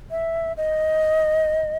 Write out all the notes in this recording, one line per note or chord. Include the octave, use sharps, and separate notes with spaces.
E5
D#5